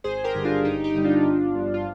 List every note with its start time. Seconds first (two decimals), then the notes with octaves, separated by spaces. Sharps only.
0.04 G#1 G#4 C5
0.24 G4 A#4
0.35 G2 D3 G3
0.45 D4 F4
0.65 G1 D#4 G4
0.84 D#4 G4
0.94 G2 D3 G3
1.04 D4 F4
1.25 G1
1.55 G2 F3
1.74 F4